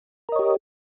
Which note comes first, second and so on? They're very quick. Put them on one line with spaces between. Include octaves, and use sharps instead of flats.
A#4 D#5 C#5 G4